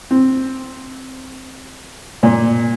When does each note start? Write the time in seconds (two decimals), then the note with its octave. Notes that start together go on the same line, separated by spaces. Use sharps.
0.11 C4
2.23 A#2